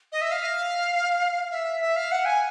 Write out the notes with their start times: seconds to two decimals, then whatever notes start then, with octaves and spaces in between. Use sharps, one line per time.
0.12 D#5
0.21 E5
0.31 F5
1.51 E5
1.81 E5
1.96 F5
2.12 F#5
2.25 G#5